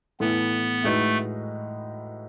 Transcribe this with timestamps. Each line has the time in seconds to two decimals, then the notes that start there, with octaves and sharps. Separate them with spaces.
0.20 A2 E3 A3 B3 E4 B4
0.84 A2 G#3 A3 D#4 F#4 B4